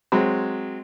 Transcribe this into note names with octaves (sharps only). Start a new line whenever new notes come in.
F#3 G#3 C4